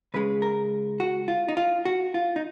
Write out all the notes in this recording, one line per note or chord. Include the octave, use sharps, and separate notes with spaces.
C#2 C#3 G#3 B4
A#4
F#4
F4
D#4
F4
F#4
F4
D#4